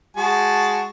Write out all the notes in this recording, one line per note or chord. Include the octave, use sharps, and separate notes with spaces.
G#3 F#4 A5